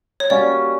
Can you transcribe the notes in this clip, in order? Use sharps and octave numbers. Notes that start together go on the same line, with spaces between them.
C#5
G3 A#3 C#4 F#4 D5